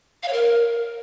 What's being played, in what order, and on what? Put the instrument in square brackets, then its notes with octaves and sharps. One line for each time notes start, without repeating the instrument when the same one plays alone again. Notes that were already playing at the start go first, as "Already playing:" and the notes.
[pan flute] F5
C#5
A#4